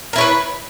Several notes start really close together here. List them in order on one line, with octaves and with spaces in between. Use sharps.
A#4 E4 C#5 B4